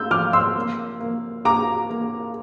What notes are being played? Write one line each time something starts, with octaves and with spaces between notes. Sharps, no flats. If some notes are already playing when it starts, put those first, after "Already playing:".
Already playing: A3 E6 G6
F3 D6 F6
C6 E6
A#3
A#3
A#3 A#5 D6
A#3